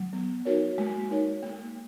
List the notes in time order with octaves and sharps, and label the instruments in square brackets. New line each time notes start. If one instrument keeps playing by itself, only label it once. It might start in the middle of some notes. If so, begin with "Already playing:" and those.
Already playing: [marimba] F#3
[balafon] B3
D#4 F#4 A#4 C#5
[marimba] G#3 [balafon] A#3
[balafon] D#4 A#4 C#5
A#3